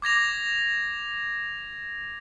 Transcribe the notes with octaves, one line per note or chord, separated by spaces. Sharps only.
D6 G#6 A#6 F7